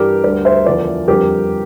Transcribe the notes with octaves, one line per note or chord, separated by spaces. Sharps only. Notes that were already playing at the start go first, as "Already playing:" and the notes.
Already playing: G2 E3 G3 G4 A#4
D2 D3 G3 A#4 D5
C5 E5
E2 D3 F3 A#4 D5
F2 D3 G3 G4 A#4